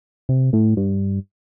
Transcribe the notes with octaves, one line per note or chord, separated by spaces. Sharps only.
C3
A2
G2